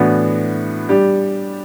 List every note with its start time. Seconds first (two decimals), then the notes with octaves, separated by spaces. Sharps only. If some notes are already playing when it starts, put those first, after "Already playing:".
Already playing: A2 E3 B3 D4 F#4
0.89 G3 D4 G4